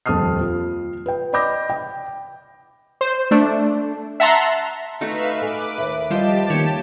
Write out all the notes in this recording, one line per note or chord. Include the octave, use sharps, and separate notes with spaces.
D#1 F2 A5 D#6 F6 C7
F4
B4 G5
D5 D#5 B5 D6 G6 A#6
G5
C5
A3 D4
E5 F#5 A5 A#5 C6
A3 D#4 F#4 B4 E5 F5
A4 B4 G#5 D6
D#2 E5
F3 G3 G4 C5 D#5 G5 A5 E7
D#3 A#3 C#5